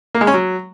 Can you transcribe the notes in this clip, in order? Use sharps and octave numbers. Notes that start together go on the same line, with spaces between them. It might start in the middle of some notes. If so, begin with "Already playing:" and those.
A#3
G#3
C#4
F#3